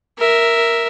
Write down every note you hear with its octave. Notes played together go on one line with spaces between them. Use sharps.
A#4 E5